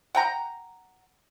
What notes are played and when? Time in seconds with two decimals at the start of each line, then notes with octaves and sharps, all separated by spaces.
0.15 F#5 G5 A#5